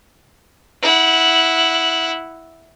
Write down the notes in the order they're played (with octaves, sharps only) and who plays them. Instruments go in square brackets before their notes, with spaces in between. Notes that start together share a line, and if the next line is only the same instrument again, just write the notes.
[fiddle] E4 F#5